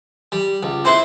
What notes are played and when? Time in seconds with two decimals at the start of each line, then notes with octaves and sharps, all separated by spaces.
0.32 G3
0.63 C#2
0.85 C4 E4 B4 C6